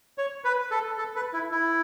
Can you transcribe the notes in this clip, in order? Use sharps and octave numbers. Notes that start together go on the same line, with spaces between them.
C#5
B4
A4
A4
B4
E4
E4